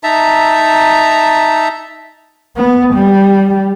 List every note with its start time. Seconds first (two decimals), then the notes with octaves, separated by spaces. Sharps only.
0.03 D#4 E5 A5 A#5
2.57 B3
2.94 G3